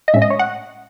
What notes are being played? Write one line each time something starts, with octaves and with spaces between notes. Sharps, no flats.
D#5
A2 G#3 C#4 E5
D#5
C#5
F#5